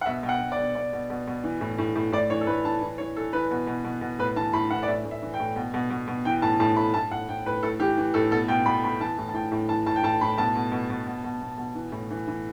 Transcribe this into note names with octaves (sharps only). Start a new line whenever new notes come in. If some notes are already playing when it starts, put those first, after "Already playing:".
F#5
B2 E5
B2 G5
F#5
B2
D5
B2
B2 D5
B2
B2
B2
E3
A2
A2
A2
A2 D5
E3 C#5
A4
A2 B4
E3 A5
E3
E3 C#5
E3 A4
E3 B4
B2
B2
B2
B2
A2 B4
E3 A5
A2 B5
E3 F#5
D5
A2 E5
A2
E5
E3
G5
A2
B2
B2
B2
B2
E3 G5
A2 A5
A2 A5
A2 B5
A2 A5
A2 F#5
A2 G5
A2 B4
A2 A4
E3 G4
E3
A2 A4
B2 A4
B2 G5
B2 B5
B2 B5
E3 A5
A2
A5
A2 G5
A2
E3 A5
A2 A5
G5
A2 A5
A2 B5
B2 A5
B2
B2
B2
B2
B2
B2
B2
E3
A2
E3
E3